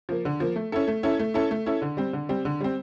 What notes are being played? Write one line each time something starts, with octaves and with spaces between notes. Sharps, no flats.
F3 A#3
D3
F3 A#3
A3
C#4 E4 A4
A3
C#4 E4 A4
A3
C#4 E4 A4
A3
C#4 E4 A4
D3
G3 C4
D3
G3 C4
D3
G3 C4